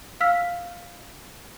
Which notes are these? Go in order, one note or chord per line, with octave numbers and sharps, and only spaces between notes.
F5 E6 F6 B6